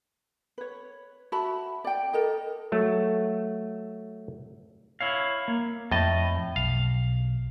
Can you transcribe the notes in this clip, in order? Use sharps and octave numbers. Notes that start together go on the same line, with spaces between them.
B4 C#5
F#4 E5 A5 B5
D5 G5
A4 A#4 D#5
F#3 A3
E4 C#5 F5
A#3
F2 A2 D#5 A5
B1 F5